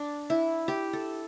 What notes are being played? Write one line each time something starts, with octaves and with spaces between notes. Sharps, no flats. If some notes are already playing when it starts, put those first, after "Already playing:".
Already playing: D4
E4
G4
A4